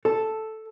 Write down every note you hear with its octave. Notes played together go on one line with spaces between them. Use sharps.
A4